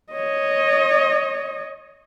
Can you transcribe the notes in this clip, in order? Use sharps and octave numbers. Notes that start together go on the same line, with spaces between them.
C#5 D#5